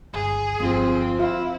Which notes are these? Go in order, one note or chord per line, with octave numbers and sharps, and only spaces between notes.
G1 C#2 G#4
G1 F2 C4
E4 F4 F5